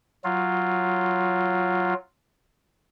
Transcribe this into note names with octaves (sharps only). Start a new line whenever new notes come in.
F#3 F4